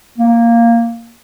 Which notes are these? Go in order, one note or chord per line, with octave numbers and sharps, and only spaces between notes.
A#3